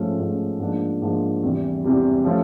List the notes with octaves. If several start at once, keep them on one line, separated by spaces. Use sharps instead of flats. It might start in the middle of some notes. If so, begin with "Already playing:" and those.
Already playing: G#2 F3 A3 C#4
G#2 F3 A3 C#4
G#2 F3 A#3 D4
G#2 F3 A#3 D4
E2 C3 E3 G3
E2 C3 E3 G3
F3 A3 C#4 F4